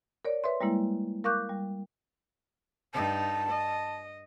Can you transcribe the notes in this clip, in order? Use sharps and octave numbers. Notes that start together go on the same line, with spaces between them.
A#4 C#5 D5
B4 C#5 E5 C6
G3 G#3 A#3 E4
A#4 F5 C#6 D6 F#6 G6
G3
G2 D#4 A5
D#5